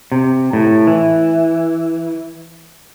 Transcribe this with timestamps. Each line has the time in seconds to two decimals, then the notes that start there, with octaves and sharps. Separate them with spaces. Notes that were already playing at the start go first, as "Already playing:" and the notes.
0.12 C3
0.53 A2
0.87 E3